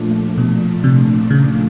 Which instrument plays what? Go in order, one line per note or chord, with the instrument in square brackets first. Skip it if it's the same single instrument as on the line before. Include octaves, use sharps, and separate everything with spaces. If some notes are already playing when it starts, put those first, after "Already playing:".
Already playing: [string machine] A#2 F3 A3 D4
[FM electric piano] B2
C3
C#3